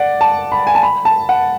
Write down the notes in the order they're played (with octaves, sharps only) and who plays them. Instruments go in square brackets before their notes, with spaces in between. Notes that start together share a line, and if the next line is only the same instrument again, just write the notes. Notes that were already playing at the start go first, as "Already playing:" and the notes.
Already playing: [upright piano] D5 F#5
A5
B5
G#5
A5
B5
A5
F#5